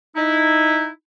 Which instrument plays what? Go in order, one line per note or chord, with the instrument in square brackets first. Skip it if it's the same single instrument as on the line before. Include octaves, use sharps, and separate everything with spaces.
[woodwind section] D#4 E4